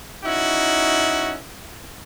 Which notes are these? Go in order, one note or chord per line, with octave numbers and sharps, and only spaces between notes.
C#4 D#4 E4 F#4